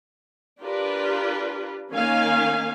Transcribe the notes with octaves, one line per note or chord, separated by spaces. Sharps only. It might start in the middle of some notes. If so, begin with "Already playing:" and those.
D4 F4 G4 A#4 B4
D#3 A#3 C#4 F5 G#5